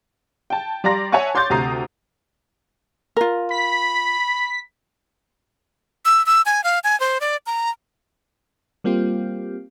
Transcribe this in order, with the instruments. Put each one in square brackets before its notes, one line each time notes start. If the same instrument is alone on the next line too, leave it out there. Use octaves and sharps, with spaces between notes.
[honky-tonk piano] G5 A5
G3 D5 A#5 C6 A#6
C#5 E5 F#5 G#5 A5 C#6
C#5 C6 D6 G6 A6
D2 C3 A#5 D#6 C7
[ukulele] F4 A#4
[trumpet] B5 [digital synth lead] B6
[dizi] E6
E6
G#5
F5
G#5
C5
D5
A#5
[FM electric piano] G3 A#3 C4 F4 G4